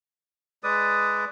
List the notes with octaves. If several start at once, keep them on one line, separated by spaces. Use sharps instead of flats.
G#3 B4 D5 D#6